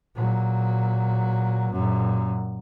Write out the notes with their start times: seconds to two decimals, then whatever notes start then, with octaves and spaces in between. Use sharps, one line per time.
0.16 A#2 F#3
1.72 F#2 A#2